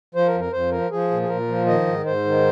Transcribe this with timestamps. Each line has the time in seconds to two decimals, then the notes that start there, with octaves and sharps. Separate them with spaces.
0.15 F3 C5
0.28 A#4
0.34 F2
0.40 A#4
0.53 F2 C5
0.72 F3 A#4
0.91 F3 G#4
1.10 A#2
1.22 G#4
1.29 A#2 A#4
1.48 F3
1.66 D#3 D#5
1.86 G#2
2.05 G#2 C5
2.25 D#3